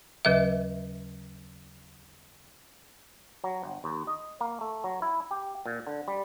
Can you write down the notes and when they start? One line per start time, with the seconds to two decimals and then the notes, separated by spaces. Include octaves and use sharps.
0.25 D#2 C#3 F#3 B4 D#5 E5
3.44 F#3
3.64 G1
3.84 D#2
4.07 D#5
4.41 A#3
4.61 A3
4.84 F#3
5.02 E4
5.31 G4
5.66 A#2
5.87 D3
6.08 G3